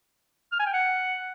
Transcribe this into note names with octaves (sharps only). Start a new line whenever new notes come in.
F6
G#5
G5
F#5